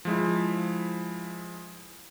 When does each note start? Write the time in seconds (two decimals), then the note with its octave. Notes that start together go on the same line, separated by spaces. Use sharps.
0.05 F3 G#3 E4